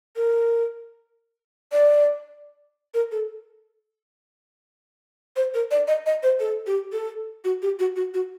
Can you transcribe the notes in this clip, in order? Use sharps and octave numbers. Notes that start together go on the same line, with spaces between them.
A#4
D5
A#4
A4
C5
A#4
D5
D#5
D#5
C5
A4
G4
A4
F#4
G4
F#4
F#4
F#4